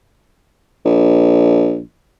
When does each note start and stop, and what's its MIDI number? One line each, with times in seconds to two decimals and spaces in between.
0.85 1.82 34